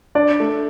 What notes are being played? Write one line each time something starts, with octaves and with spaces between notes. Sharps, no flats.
D4 D5
A3